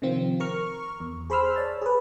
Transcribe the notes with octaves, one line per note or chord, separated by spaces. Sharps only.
C3 D#3 F3 C4 F4
A#4 A#5 C#6 F6
E2
G#4 C5 B5 C6 E6 F6
C#5 D5 A5
G#4 B4